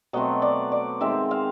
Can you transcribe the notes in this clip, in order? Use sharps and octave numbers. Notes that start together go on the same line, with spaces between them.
B2 F#3 A3 C4 D#5
D5
D5
D#3 G#3 C4 E5
F5